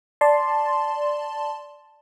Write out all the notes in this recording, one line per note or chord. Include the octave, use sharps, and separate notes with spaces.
D5 A5 C6